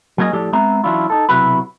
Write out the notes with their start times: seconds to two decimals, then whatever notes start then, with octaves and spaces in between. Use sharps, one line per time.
0.18 F#3 A#3 C#4 E4 G#4 D#5
0.33 A2 F3 G4 A4 D5
0.53 G#3 B3 C4 E5 A#5
0.84 E3 F#3 C#4 D4 E4 F4
1.10 D#4 A4
1.29 B1 C3 F#3 E4 F#4 B4